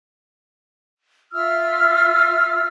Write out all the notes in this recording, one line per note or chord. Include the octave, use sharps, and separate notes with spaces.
F4 E5 E6 F6